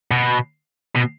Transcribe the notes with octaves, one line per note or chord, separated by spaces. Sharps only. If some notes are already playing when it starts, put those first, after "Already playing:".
B2
B2